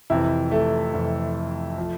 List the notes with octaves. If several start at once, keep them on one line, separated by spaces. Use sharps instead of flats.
F2 C3 E3 E4
A3
F2 C3 E3
F3